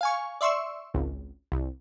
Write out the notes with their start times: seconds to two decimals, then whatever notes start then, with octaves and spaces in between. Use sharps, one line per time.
0.01 F5 G#5 C#6
0.41 D5 E5 C6 C#6 E6
0.94 G#1 C#2
1.52 C2